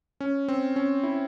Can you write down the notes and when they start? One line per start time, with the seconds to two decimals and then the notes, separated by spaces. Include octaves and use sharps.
0.20 C#4
0.48 C4
0.76 C#4
1.04 E4